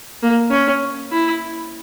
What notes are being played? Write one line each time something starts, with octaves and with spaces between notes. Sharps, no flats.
A#3
C#4
E4